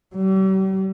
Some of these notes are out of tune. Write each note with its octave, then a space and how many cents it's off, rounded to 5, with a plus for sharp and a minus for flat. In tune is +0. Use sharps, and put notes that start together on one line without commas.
G3 -40